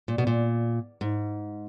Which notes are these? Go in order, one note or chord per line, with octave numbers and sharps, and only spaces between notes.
A#2
B2
A#2
G#2